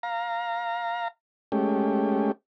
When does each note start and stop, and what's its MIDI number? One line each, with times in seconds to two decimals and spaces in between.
0.03 1.08 77
0.03 1.08 82
1.52 2.32 56
1.52 2.32 57
1.52 2.32 61
1.52 2.32 67